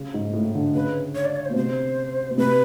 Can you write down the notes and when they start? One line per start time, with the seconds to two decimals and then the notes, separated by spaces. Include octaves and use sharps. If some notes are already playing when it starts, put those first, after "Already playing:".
Already playing: C#3
0.14 G#2
0.33 A2
0.44 A2
0.55 D3
0.75 C#3 B4
1.15 C#5
1.25 D5
1.36 C#5
1.45 C5
1.50 B2
1.56 C3 C5
2.31 B2
2.38 C3 B4